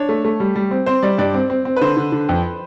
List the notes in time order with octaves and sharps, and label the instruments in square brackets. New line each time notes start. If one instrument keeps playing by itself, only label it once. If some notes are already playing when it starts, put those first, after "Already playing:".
Already playing: [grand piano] D4 [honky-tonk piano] C#5
[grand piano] A3
A3
G3
G3
C4
[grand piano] C4 [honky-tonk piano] C5
[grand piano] G3 [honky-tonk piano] D5
[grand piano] G2 [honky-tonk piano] D5
[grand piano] C4
C4
C4
[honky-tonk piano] B4
[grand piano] D3 [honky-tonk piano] C5
[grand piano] D3
D3
F2